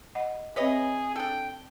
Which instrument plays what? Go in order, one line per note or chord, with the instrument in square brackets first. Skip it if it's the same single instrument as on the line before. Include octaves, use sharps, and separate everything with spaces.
[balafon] D#5 F#5
[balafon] C4 E5 [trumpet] G#4 [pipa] B4 C#5 D#5
[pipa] D4 A4 [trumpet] G5